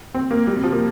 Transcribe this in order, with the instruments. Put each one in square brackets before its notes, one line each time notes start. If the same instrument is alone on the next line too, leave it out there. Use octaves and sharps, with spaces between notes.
[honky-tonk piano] C4
A#3
G3
C3
F3
A#3